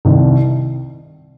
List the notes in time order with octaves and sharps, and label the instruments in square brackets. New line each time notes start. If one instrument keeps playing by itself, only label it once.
[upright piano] C2 C3 D#3